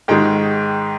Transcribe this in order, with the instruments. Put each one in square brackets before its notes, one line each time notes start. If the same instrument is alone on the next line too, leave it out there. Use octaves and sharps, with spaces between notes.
[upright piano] G#2 D#3 G#3 G4 G5